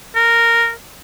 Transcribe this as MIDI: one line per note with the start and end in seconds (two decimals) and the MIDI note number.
0.15 0.70 70